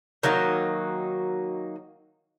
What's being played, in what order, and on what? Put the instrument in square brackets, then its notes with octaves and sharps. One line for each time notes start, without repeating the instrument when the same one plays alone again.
[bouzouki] D#3 F#3 A#3 D#4